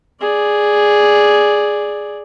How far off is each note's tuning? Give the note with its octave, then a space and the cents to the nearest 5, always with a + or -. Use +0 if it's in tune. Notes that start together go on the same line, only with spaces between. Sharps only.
G#4 +0 D5 +0